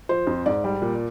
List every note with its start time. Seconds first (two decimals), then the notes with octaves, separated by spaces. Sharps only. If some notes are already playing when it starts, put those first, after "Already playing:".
0.09 F3 C5
0.27 F2
0.46 G#2 D5
0.64 G3
0.82 A#2